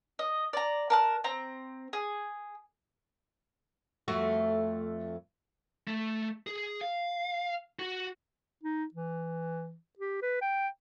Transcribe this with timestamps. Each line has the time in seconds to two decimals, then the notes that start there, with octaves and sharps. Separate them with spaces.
0.19 D#5
0.53 D5 A#5
0.90 A#4 A5 F#6
1.24 C4 A#5
1.93 G#4
4.08 F2 A3 F#4
5.87 A3
6.47 G#4
6.81 F5
7.79 F#4
8.63 D#4
8.94 E3
9.99 G4
10.22 B4
10.42 G5